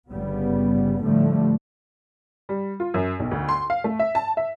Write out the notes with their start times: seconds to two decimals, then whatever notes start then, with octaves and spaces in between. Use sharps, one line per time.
0.10 G1 C#3 G3 B3
1.03 A2 D3 F3 G3 A3
2.49 G3
2.80 F4
2.94 F#2
3.20 B1
3.31 D2
3.49 C6
3.70 F5
3.84 A3
3.99 E5
4.15 A5
4.37 E5